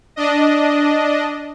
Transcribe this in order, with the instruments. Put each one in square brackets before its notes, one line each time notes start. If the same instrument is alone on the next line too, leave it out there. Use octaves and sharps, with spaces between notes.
[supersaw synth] D4 D#5